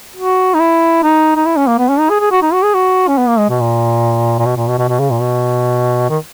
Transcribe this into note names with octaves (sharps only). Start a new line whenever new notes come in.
F#4
D#4
E4
D#4
D#4
E4
C#4
A#3
B3
C#4
D#4
G#4
G#4
F#4
D#4
F#4
G#4
F#4
C#4
B3
A#3
G#3
B2
A#2
A#2
B2
A#2
B2
B2
B2
C#3
A#2
B2
D#3